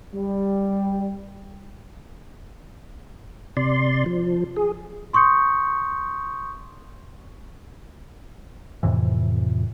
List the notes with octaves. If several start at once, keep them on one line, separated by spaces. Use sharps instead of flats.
G3
C3 D5 C6
F3
G#4
C6 C#6 D#6 G6 C#7
F2 A2 C3 E3